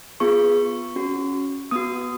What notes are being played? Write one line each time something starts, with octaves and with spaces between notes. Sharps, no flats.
B3 F4 G#4 C#6
C#4 F#4
B3 F#4 D#6